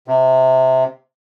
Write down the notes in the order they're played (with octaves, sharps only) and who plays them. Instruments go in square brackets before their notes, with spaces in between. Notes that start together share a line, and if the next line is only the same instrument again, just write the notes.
[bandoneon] C3